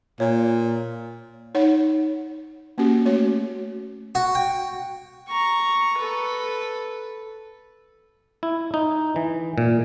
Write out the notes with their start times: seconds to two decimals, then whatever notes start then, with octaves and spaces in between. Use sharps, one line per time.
0.20 A#2 C#5
1.55 D#4 C#5 F#5
2.78 A#3 C#4 F#4 G4
3.05 A3 F#4 C#5
4.15 F#4
4.35 G5
5.28 A#5 C#6
5.98 A4 B4
8.43 E4
8.74 D#4
9.16 E3
9.58 A#2